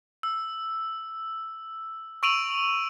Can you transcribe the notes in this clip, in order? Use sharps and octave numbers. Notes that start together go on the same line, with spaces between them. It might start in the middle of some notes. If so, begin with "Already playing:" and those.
E6
C#6 E6 D7 D#7 F7 F#7